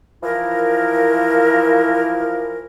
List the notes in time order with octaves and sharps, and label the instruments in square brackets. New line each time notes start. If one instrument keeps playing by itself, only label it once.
[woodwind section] E3 F3 E4 A#4